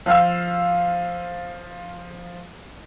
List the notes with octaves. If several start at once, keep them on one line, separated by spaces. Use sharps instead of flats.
F3 F5 E6